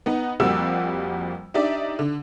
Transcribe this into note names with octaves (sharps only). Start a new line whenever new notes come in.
B3 D#4 F#5
F2 F3 G3 A#3 F#4 E6
D4 D#4 G4 D5 E5
D3